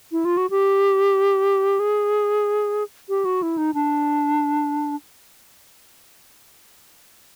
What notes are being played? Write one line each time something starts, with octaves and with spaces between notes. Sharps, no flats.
E4
F4
F#4
G4
G#4
G4
F#4
E4
D#4
D4